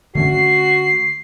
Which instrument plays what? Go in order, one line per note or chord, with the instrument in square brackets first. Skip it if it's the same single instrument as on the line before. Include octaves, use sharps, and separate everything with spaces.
[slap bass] D3 A3 C#4 [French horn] F#4 [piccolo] C7